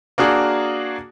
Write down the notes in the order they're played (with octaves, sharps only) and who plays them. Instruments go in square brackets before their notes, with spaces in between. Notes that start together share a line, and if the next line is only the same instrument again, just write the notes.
[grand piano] A#3 D4 F#4 G#4